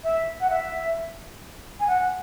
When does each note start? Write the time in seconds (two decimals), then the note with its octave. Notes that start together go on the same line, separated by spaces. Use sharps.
0.04 E5
0.40 F#5
0.50 E5
1.80 G#5
1.87 F#5